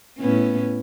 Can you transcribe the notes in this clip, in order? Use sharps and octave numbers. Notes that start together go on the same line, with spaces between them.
A2 B3 C#4